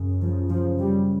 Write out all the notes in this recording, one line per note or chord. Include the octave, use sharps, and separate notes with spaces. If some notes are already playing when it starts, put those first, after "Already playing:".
Already playing: F#2 C#3
F3
F3
G3